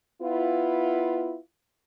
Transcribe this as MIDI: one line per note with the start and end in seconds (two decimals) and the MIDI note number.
0.22 1.38 59
0.22 1.38 64
0.22 1.38 65